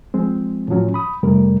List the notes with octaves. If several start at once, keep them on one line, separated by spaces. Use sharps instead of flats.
F3 G#3 C4
A2 D#3 F3 F#3 C#4
B5 D#6
F2 C3 G3 A3 A#4